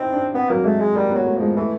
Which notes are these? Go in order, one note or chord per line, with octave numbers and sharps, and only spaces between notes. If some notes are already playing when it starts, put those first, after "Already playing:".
Already playing: C4 D#4 E4
D4
B3 C4
F#3 A#3
G#3 A3
G#3
G3 A#3
F#3 B3
A3
F3 G#3
E3 A3